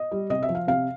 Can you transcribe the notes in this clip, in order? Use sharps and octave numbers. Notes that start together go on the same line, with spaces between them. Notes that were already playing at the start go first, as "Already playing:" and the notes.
Already playing: D#5
G3
C3 D#5
E5
F3
F5
C3 F5